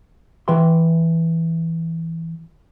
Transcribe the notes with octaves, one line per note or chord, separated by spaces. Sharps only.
E3 B4 E5 G5 C6